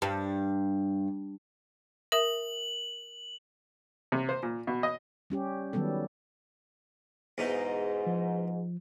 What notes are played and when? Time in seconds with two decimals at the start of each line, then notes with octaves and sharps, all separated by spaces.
0.02 G2
2.12 A#4 E5 D#6 F#7
4.12 C3
4.29 C5
4.43 A#2
4.67 B2
4.83 D#5
5.30 G3 C#4 G4
5.73 D#3 F#3 G3 B3 A4
7.38 E2 G#2 B2 D#4
8.07 F3